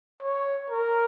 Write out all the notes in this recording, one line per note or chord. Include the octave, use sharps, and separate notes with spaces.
C#5
A#4